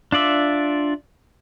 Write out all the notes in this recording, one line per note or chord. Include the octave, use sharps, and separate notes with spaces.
D4 F4 D5 E5